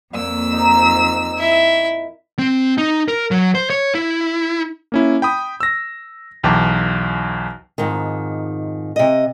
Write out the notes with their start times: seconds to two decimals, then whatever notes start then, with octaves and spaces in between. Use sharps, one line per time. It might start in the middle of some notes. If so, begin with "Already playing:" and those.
0.13 F2 A#2 E6
0.53 D#4
1.38 E4 E5
2.39 C4
2.78 D#4
3.08 A#4
3.31 F#3
3.55 C5
3.70 C#5
3.95 E4
4.92 A#3 C#4 E4
5.22 G5 B5 D#6
5.60 E6 A#6
6.43 B1 E2 G5 A5 D6
7.78 F2 G#2 D#3
8.96 C3 D#5